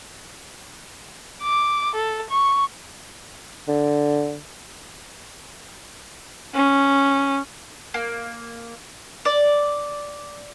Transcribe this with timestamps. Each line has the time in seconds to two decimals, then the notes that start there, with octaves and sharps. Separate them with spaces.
1.42 D6
1.95 A4
2.30 C#6
3.68 D3
6.55 C#4
7.94 A#3
9.25 D5